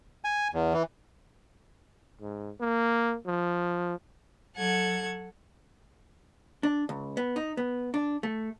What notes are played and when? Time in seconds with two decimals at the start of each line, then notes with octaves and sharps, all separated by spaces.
0.24 G#5
0.54 E2
0.74 E3
2.21 G#2
2.61 A#3
3.27 F3
4.55 F#3 A4 F#5 G#6
6.63 D4
6.89 C#2
7.17 B3
7.36 D#4
7.57 B3
7.94 D4
8.23 A3